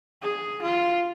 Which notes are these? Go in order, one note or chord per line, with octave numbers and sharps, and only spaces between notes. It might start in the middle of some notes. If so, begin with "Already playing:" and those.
G#4
F4